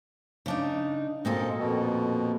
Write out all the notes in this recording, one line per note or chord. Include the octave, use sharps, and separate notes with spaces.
C#3 D4 D#4
F#2 A#2 A#3 C4 A4 D#5
F2 B2